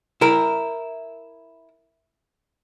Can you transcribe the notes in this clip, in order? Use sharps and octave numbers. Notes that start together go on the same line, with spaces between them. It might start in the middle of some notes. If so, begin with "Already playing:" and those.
E4 A#4